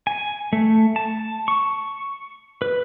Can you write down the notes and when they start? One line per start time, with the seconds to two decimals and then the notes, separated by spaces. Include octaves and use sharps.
0.07 G#5
0.53 A3
0.96 A5
1.48 C#6
2.62 B4